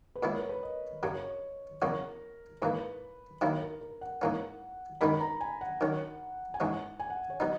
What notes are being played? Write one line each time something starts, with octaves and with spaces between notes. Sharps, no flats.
B4
A#2 G#3 B3 E4 C#5
A#4
B4
D#5
F#2 C#3 F#3 C#5
E2 C#3 F#3 C#4 F#4 A#4
G#2 E3 A#3 B4
D#3 F#3 A#3 E4 A#4
A#4
A#4
F#5
G#2 E3 A#3 C#4
F#2 D#3 G#3 B3 D#4 B5
A#5
G#5
F#5
D#3 F#3 C#4
G#5
G#2 E3 G#3 C#4 F#5
G#5
F#5
C#5
F#3 B3 D#4 D#5